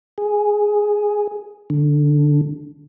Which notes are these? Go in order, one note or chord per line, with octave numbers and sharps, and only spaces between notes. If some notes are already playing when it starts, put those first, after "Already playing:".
G#4
D3